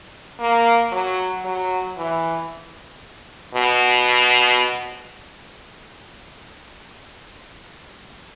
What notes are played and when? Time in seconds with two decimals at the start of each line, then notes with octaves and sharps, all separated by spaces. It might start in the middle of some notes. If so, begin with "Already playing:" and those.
0.40 A#3
0.92 F#3
1.45 F#3
1.98 E3
3.55 B2